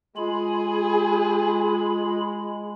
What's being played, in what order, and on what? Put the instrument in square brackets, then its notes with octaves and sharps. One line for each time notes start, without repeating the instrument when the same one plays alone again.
[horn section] G#3 [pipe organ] F4 B5 [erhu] G#4